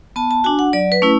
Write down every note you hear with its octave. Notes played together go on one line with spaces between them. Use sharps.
B3 A5
A5
D4 F#4 G#5
F#5
F#3 D5
B4
A3 C#4 E4